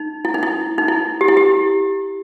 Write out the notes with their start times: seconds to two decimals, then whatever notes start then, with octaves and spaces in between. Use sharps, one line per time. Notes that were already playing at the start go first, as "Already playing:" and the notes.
Already playing: D#4
0.25 E4
0.34 D#4
0.43 E4
0.78 D#4
0.88 E4
1.21 G4
1.28 E4
1.37 G4